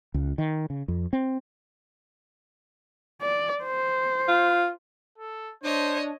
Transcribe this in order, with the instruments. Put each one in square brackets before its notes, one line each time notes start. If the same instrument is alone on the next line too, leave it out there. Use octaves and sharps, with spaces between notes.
[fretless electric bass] C#2
D#3
C#3
F2
C4
[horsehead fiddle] D5
C5
[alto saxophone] F4
[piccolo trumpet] A4
[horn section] D4 [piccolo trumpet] C5 [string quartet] C#5 D#5